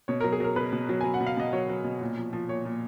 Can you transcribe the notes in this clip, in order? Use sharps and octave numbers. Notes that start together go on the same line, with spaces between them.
B2 C#5
F#3 A#4
G#4
F#3 A#4
B2 B4
B2
F#3
F#3 G#5
F#5
B2
F5
B2 D#5
F#3 C#5
F#3
B2
A#2
F3
F3
A#2 C#5
A#2